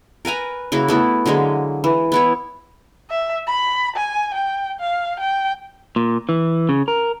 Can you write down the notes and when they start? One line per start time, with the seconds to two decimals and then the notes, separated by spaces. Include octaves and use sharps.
0.25 A#4 B4 G#5 A#5
0.72 C#3 A#3 E4 F#4
0.88 A3 B3 E4
1.26 D3 F#3 G#3 A#3
1.84 E3
2.12 B3 E4 C#5
3.10 E5
3.47 B5
3.96 G#5
4.34 G5
4.80 F5
5.20 G5
5.96 A#2
6.29 E3
6.69 C#3
6.88 A#4